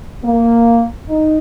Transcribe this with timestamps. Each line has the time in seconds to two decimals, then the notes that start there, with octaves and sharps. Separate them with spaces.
0.24 A#3
1.09 D#4